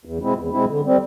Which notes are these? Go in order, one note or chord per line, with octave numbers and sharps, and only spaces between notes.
E2
B2 G#3 C4 E4
E2
B2 G#3 C4 E4
D3
G3 C4